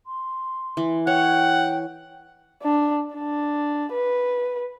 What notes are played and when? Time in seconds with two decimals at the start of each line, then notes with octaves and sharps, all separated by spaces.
0.06 C6
0.77 E3
1.07 C#5 F#5 G5
2.63 D4
3.14 D4
3.92 B4